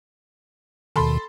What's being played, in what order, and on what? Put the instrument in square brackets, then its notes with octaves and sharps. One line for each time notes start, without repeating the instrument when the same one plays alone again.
[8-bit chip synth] D#2 B2 D#3 [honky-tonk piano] A4 B5 C6